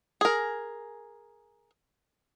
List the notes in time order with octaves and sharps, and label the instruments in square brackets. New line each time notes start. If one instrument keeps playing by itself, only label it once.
[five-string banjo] G#4 A#4